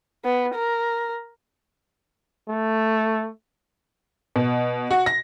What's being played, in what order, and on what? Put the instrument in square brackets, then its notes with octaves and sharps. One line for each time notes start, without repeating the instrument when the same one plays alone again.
[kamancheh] B3
A#4
[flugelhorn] A3
[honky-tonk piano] B2
F#4
A#6